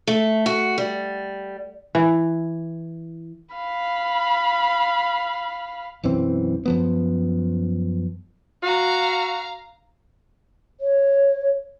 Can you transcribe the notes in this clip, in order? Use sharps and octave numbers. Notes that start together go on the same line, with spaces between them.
A3
F#4
G3
E3
F5 B5
B1 F#2 E3 C4
F#2 F3 B3
F#4 F5 A#5
C#5